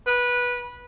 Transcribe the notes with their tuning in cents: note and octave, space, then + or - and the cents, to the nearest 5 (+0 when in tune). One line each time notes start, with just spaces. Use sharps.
B4 -15